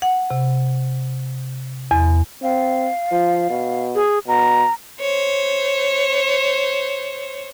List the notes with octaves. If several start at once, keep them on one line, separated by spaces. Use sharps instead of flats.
F#5
C3
E2
C4 F5
F3
B2
G#4
B2 A#5
C5 C#5